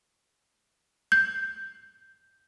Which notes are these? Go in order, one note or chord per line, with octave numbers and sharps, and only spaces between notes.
G6